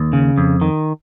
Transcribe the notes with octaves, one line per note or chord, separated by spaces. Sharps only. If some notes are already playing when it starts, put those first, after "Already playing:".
Already playing: D#2
C#3
F2
D#3